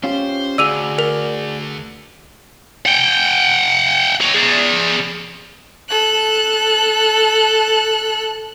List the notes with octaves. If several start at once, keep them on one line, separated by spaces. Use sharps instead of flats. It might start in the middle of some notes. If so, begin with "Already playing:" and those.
C#4 F4 G4 C5
D2 F#4 G#4 D5 E6 D#7 F7
A#4 F7
F#5 G5
C#5 D#5
G#4 D5
A4 F#6